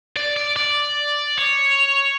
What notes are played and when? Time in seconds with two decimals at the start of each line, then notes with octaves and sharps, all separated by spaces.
0.16 D5
0.36 D5
0.56 D5
1.37 C#5